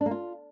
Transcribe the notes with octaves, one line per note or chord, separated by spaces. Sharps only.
D4
A#3
F4